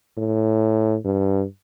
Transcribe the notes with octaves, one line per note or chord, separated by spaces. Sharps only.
A2
G2